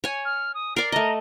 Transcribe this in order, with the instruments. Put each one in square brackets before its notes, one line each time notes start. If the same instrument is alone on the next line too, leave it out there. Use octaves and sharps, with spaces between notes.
[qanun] C#5 G#5
[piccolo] F6
D#6
[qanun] A#4 D5 [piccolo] C7
[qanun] A3 D#5 [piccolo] A#5